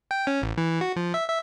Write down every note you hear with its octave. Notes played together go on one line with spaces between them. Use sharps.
G5
C#4
A1
E3
F#4
F3
E5
E5